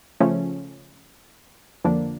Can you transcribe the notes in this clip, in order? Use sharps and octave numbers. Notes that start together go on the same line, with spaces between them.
C#3 F3 A3 C#4
F2 D3 F3 A#3 D4